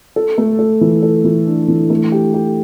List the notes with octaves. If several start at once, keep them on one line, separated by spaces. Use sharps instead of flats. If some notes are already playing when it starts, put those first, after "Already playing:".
A4
A3
A4
E3
A4
E3
D4
E3
A3
G4
G4